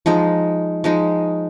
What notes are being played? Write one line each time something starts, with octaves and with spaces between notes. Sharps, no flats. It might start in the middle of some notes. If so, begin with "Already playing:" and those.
F3 G#3 D#4
F3 G#3 D#4